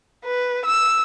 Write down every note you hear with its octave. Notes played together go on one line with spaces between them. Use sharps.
B4
E6